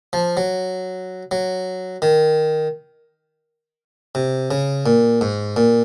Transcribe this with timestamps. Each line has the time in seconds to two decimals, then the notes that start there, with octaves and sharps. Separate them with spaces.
0.13 F3
0.37 F#3
1.31 F#3
2.02 D#3
4.15 C3
4.51 C#3
4.86 A#2
5.21 G#2
5.57 A#2